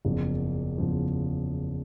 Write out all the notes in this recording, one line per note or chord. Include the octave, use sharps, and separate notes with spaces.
F#1 E2 C#3 F3
F#1 E2 C#3 F3